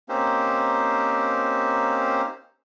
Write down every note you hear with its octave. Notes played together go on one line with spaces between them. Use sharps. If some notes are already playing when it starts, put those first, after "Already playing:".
A#3 C4 C#4 D#4 G4 C5